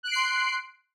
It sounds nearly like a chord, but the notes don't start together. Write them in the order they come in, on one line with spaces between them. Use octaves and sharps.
F#6 D7 C7 C6